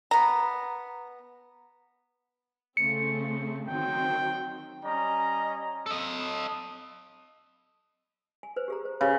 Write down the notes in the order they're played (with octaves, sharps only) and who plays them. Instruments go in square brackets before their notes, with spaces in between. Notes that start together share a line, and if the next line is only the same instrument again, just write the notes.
[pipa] B3 A#5
[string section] C#3 A3 C4 [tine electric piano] C#7
[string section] D#3 F#3 C4 [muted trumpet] G5
[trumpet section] G3 C#4 D#5 A#5
[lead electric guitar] A4 D#5
[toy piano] G#5
B4 C5
G4 G#4 A#5
C5
[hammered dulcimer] C#3 [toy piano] G4 B4 F5